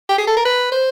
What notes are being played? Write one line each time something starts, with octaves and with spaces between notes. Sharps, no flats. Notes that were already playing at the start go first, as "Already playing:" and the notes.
G4
G#4
A4
A#4
B4
C5